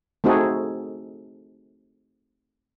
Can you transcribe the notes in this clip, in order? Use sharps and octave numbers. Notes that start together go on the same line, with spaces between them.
A3 C4 D#4 F#4 G#4 A4